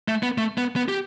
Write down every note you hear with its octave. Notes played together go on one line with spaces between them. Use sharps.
A3
B3
A3
B3
B3
G4